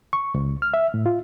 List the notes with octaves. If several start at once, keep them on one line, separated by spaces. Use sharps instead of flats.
C#6
C#2
F6
E5
A2
F4